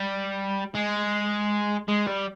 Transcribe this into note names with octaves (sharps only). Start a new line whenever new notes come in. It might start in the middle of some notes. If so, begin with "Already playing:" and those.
Already playing: G3
G#3
G#3
G3